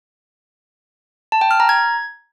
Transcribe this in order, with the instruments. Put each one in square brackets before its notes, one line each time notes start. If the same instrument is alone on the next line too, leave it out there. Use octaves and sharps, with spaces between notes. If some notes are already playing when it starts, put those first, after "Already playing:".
[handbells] A5
G5
F6
A#5
G#6